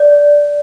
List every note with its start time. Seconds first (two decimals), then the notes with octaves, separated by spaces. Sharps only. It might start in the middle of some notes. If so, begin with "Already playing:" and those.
Already playing: D5